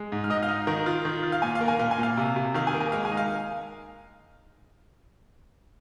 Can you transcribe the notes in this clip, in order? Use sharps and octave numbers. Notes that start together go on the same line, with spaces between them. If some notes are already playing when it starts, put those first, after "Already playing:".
Already playing: G#3
G#2
F6
G#2 D#5 D#6
F5 F6
D#4
D#3 A#4 A#5
F4
D#3
F4
F5
A#2 G#5
F5
A#3
G#5
A#2 F5
G#5
A#2 F5
C3
C3
D#3 F5
G#5
A#3
G#5
G#3 F5
G#5
D#4
F5